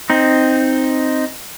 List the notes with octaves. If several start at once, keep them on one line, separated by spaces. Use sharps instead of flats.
C4 D#4